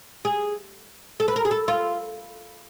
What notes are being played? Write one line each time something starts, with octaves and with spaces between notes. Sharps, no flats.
G#4
A4
B4
A#4
G#4
A4
F4